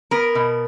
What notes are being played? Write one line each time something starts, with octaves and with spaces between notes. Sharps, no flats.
B3 A#4
B2